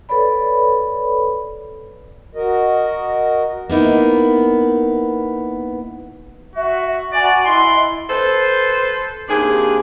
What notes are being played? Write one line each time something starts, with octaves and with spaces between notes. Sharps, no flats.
A4 B4 C#5 D5 B5
F#4 A#4 D#5
A#3 B3 D#4 E4
F#4 E5
F#4 D5 G#5 A#5
E4 D#5 C6
A4 B4 C5
D#2 C3 D4 G#4